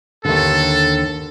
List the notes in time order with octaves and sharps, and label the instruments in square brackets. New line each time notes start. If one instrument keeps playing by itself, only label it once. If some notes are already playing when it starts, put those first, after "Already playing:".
[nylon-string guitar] D#2 D3 [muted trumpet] A4